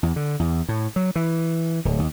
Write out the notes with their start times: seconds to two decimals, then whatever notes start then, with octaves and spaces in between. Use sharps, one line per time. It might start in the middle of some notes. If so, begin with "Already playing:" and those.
0.03 E2
0.16 D3
0.39 E2
0.69 A2
0.96 F#3
1.16 E3
1.85 D1
1.99 D#2